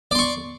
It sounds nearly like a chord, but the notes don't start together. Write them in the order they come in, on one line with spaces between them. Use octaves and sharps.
D5 C6 C#6